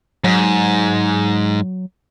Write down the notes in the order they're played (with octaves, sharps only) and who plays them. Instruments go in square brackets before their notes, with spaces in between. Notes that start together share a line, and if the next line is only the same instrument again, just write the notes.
[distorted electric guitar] G#2 [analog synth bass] F#3